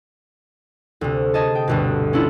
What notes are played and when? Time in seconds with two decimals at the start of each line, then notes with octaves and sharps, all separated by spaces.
1.01 D2 C3
1.34 G#4 D#5 A5
1.55 G5
1.68 G1 D2 B2
2.13 C#4 D4 E4 F4